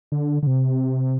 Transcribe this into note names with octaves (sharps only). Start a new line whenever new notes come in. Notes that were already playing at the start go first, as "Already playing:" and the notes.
D3
D3
C3